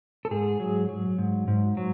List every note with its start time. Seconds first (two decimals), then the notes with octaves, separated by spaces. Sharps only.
0.25 A4
0.31 G#2 G#4
0.60 F#3
0.89 F#3
1.18 G#2
1.48 G#2
1.77 F#3